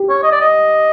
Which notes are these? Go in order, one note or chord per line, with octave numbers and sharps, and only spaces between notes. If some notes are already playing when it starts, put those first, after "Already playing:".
Already playing: G4
C#5
D#5
D5
D#5